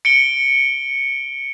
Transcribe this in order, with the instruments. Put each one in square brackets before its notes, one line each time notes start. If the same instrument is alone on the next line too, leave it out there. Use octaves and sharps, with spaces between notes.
[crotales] C#7 D7 G7